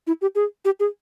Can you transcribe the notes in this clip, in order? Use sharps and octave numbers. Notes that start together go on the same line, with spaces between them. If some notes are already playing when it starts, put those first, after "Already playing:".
E4
G4
G#4
G4
G#4